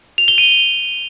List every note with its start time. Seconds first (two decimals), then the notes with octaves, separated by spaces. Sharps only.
0.18 F7
0.28 G7
0.38 D#7